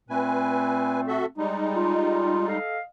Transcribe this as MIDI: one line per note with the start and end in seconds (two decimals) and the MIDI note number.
0.09 1.25 46
0.09 1.25 57
0.09 1.25 60
0.09 1.01 71
0.09 1.01 80
1.07 1.26 66
1.07 1.26 69
1.07 1.26 76
1.38 2.58 55
1.38 2.58 56
1.38 2.58 63
1.75 2.47 65
2.47 2.79 69
2.47 2.79 75
2.47 2.79 77